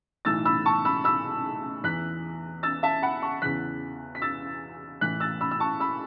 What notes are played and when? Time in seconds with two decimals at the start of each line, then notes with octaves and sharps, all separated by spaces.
0.25 B1 A2 E3 E6 A6
0.45 B5 E6
0.66 A5 C#6
0.85 B5 E6
1.04 B5 E6
1.84 E2 E3 F#6 B6
2.63 E6 A6
2.83 E5 A5
3.02 F#5 B5
3.22 A5 C#6
3.42 E2 C#3 E3 F#6 B6
4.15 B6
4.22 E6 A6
5.01 A1 A2 E3 F#6 B6
5.20 E6 A6
5.41 B5 E6
5.51 E6
5.60 A5 C#6
5.80 B5 E6